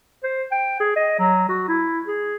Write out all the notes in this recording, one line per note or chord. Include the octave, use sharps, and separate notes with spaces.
C5
G5
G#4
D#5
F#3
F#4
E4
G#4